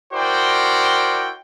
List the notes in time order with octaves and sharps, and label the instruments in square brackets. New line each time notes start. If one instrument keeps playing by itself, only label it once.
[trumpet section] E4 F#4 A#4 C5 D5 G5